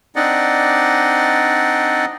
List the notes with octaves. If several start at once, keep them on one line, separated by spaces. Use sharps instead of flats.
C4 D4 D#4 D5 D#5 F#5